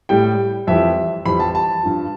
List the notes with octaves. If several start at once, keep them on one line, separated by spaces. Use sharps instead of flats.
A2 G3 G5
F2 E3 G3 E5
F2 E3 G3 B5
A5
A5
G2 F3